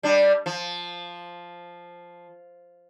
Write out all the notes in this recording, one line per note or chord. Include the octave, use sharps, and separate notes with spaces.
G3 D4
F3